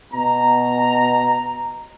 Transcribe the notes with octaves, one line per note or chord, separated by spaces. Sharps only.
B2 A#5